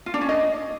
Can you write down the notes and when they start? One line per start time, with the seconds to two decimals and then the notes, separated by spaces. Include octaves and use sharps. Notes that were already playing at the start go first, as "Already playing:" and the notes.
0.06 F4
0.14 D4
0.21 C#4
0.29 D#5